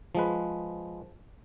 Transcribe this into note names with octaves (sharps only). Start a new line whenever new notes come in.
F3 G#3 B4